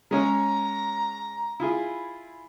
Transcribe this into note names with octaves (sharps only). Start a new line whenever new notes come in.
G#3 C#4 C#5 A#5
E4 F4 G#4